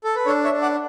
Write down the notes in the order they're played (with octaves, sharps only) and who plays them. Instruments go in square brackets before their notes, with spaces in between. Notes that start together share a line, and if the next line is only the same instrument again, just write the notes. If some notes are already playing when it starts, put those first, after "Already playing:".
[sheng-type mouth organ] A4
B4
D4 A4 C#5
C#5 E5
D4
D5 F#5